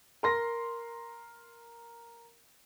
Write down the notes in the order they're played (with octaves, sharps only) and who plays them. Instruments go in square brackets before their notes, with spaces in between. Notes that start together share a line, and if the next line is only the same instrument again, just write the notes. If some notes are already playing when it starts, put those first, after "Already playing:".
[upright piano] A#4 C6 A#6